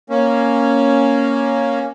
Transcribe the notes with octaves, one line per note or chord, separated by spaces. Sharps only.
A#3 C#4